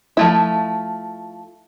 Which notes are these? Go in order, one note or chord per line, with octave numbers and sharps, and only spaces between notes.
F3 A3 E4